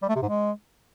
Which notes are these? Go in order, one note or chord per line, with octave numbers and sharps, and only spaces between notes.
G3
A3
C3
G#2
G#3